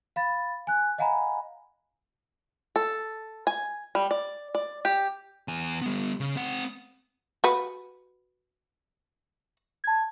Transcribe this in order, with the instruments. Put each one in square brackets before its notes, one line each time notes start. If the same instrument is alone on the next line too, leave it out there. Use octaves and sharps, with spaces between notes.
[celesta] F5 B5 A6
G#5 F#6
D#5 F5 F#5 G#5 A#5 B5
[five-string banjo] A4
G#5
G3
D5
D5
G4
[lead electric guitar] E2 G#5
G3 B3
C#3
C4 F#5
[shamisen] F#4 B4
[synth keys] A5 G#6